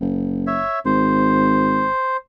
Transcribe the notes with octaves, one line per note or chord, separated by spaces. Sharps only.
F#1
C#5 E5
G#1 C5